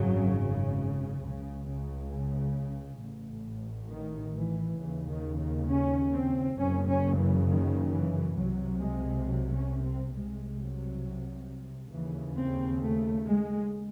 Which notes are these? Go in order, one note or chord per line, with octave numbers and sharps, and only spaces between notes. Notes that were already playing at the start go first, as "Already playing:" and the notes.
Already playing: G#1 F#2 C#3 F#3
C#2 C#3
C#3
A1 A2
D#3
E3
D#2 C#3 E3
D#3
D#3
C#4
C4
F#1 F#2 C#3 C#4
C#4
E3
D#3
E3
C2 C3 F#3
G#3
F#3
C#4
C4
C2 C3 G#3
F#3
D#2 C#3 E3
C4
A3
G#3